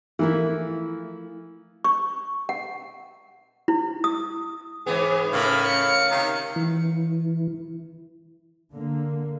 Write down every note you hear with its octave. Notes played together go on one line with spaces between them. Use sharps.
E3 F3 A3 A#3 E4
C#6
F#5
E4
D#6
G#2 E3 B3 G#4
A2 C#3 A#4 F5 B5
C#7
C3 D#3
E3
D3 A#3